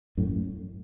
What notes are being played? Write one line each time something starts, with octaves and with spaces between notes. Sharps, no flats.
F#2 A2